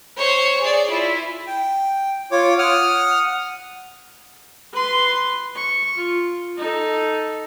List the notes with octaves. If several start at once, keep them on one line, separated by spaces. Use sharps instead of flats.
C5 C#5
G#4 D5
E4 F4
G5
F4 C#5 D6
F#5 D#6 F6
B4 C6
C#6
F4
D#4 A4